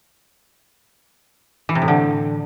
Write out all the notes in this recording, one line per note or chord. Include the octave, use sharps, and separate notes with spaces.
E3
C3
A2
D3